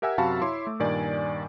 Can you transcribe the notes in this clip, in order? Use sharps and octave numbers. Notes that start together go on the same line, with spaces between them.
G4 A#4 E5 F#5 G#5 E6
F#2 C3 F#4 F5 A5 B5
E4 C#5 E5 C6 D6
A3
G2 A#2 D#3 D5 G#5